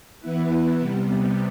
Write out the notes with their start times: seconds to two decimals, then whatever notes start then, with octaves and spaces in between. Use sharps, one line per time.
0.20 E3 B3 E4 B4
0.80 C3 G3 B3